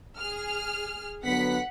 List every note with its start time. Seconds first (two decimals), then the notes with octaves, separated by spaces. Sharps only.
0.18 G#4 F6
1.24 D3 F#3 B3 F#5 B6